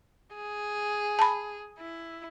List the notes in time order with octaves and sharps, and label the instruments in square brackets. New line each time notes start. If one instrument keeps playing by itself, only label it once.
[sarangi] G#4
[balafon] A5 B5
[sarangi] E4